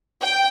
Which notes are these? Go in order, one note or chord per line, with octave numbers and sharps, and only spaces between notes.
G5